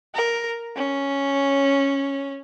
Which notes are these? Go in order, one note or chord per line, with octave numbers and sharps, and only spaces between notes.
A#4
C#4